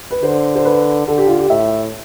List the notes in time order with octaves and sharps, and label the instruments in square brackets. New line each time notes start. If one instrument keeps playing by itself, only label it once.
[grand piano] B4
[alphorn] D3 [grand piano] C5
[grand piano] C5
B4
[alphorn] D3 [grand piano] A4
[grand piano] G4
F4
G4
[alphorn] A2 [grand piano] E5